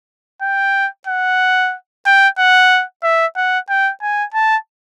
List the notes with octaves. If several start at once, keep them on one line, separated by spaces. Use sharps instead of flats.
G5
F#5
G5
F#5
E5
F#5
G5
G#5
A5